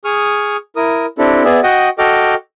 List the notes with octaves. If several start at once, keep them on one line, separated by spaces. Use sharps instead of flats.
G#4 C#6 D#6 F6
E4 A#4 D#6
C4 D4 E4 G4 A4
B3 G#4 D5 E5
F#4 D#5 F#5 G5 D#6
F#4 A4 D#5 G5 D6 F6